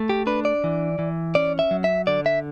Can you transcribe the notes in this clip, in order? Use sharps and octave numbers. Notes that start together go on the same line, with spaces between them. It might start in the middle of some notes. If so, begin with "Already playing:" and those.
Already playing: A3
G4
D4 B4
D5
E3
E3
C#4 D5
E5
F#3
E5
D3 D5
E5